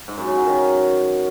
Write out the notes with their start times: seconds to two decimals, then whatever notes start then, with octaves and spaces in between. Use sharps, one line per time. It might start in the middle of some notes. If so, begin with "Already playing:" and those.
0.08 G#2
0.18 F#2
0.27 C#3
0.37 F#3
0.46 D#3